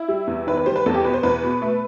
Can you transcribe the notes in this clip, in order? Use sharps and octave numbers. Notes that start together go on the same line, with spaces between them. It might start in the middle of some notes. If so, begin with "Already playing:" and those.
Already playing: E4
G3
E2
D#3 B4
B4
G3 C5
B4
E2 A4
G4
B2 B4
C5
E2 B4
B2
A3